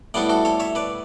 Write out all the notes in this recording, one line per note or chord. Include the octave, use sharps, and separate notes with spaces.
A2 G3 B3 E4 D5 F#5
F#4 A4
A4 C#5
C#5 E5
B4 D5